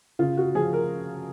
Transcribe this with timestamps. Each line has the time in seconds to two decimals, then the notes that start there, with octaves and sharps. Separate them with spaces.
0.19 C#3 F4
0.37 F#4
0.55 F3 G#4
0.73 A#4